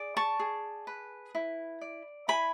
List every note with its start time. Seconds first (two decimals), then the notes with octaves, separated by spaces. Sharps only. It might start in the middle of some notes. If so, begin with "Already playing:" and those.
Already playing: G#4 D5
0.17 A5 C#6
0.40 G#4
0.87 B4
1.35 E4
1.81 D5
2.28 E4 G#5 B5